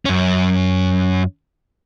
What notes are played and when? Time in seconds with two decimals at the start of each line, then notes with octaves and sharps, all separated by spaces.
0.05 F#2 C#4